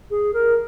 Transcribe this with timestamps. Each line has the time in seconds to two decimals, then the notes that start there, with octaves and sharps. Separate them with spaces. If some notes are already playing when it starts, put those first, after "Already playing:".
0.11 G#4
0.34 A#4